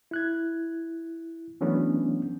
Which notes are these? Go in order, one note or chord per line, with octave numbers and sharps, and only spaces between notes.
E4 F#6 G#6
E3 F#3 A3 B3 C#4 D4